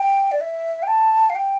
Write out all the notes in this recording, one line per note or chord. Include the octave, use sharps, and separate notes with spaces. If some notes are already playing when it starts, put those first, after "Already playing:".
Already playing: G5
D5
E5
G5
A5
F5
G5